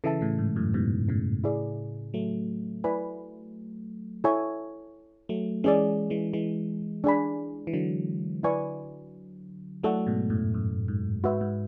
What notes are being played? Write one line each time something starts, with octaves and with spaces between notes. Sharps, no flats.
C#3 E3 A4 E5 A5
A2 C#3
G#2
F#2 A2
G#2 B2
A2 C#3
E4 G#4 D5
F#3 A3
E4 B4 D5 G#5 B5
E4 A4 C#5 E5 G#5
F#3 A3
E3 G#3 C#4 G#4 D5
E3 G#3
E3 G#3
D4 G#4 D5 G#5 B5
E3
D3 F#3
E4 B4 D5 G#5 C#6
F#3 A3 E4 A4 D5 F#5 C#6
G#2 B2
F#2 A2
F#2
G#2
G#2 F#4 B4 E5
G#2